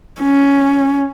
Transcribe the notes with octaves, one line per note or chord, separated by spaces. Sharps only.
C#4